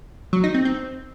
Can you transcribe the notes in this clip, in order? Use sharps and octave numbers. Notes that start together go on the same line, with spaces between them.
F#3
D#4
C4
C4